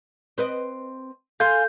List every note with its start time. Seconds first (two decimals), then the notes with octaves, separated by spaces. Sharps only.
0.38 C4 B4 D#5
1.40 A4 F5 G#5 C6 G6